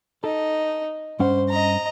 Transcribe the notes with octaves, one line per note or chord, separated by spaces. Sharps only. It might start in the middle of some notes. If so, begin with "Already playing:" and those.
D#4 A4
G2 C#4 C5 F#5
D#5 A#5